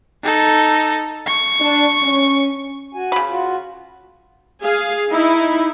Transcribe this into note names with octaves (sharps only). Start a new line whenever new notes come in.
D#4 A4
C#6
D4
C#4
F#4 G#5
C#3 B5
F4 F#4
G#4 F5
D#4 E4